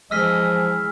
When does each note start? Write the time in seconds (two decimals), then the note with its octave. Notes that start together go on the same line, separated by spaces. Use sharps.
0.11 E3 F3 G#3 D#5 E6 F6 B6